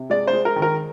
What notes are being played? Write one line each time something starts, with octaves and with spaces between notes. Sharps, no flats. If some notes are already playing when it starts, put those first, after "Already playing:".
Already playing: C3
G#3 D5
C5
G#3
A#4
D#3
A#4